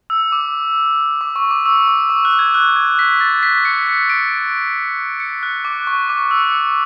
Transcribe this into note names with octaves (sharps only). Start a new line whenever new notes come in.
E6
D6
D6
C#6
D6
E6
D6
D6
F#6
G#6
F#6
G#6
B6
A6
B6
C#7
C#7
D7
C#7
F#6
D6
C#6
D6
E6